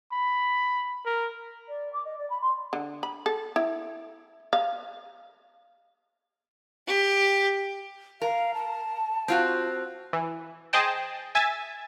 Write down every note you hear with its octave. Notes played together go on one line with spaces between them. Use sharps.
B5
A#4
D5
D6
D#5
D5
B5
C6
D3
B5
A4
E4
F5
G4
A#4 F5
A5
C4 F4 F#4
E3
G#4 C5 D#5 G5 A5
E5 G#5 A6